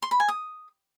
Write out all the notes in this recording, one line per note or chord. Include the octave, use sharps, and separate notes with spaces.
C6
B5
G#5
D#6